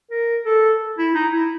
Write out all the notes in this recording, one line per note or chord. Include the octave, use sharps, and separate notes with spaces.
A#4
A4
E4
D#4
E4